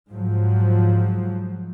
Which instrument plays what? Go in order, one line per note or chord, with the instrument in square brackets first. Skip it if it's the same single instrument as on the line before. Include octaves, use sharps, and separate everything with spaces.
[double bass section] G#2 F3 F#3